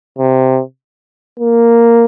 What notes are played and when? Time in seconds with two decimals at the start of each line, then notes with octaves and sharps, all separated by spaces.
0.19 C3
1.39 A#3